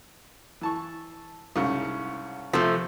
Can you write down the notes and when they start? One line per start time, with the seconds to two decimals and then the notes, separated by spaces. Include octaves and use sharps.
0.61 E3 A5 C#6
1.56 C2 G#2 C#3
2.53 C3 F3 A3